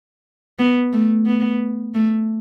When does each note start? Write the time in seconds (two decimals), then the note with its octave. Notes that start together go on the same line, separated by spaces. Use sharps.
0.59 B3
0.93 A3
1.26 B3
1.94 A3